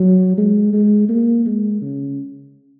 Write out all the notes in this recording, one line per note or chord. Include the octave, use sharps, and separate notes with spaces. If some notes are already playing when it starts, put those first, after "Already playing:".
Already playing: F#3
G#3
G#3
A#3
G#3
C#3